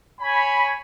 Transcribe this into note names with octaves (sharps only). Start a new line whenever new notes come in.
C#5 G#5 B5